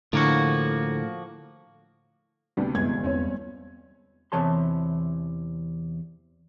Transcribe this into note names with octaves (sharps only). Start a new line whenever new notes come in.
A2 D3 F3 A#3 F#4
D2 C3 G3 B3
G1 E3 G#3 G#6
E2 C4 C#4 C#5
E2 C3 E3 C#5 A5 C6